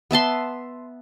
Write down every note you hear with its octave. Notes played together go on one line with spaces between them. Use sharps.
B3 E5 A5 C6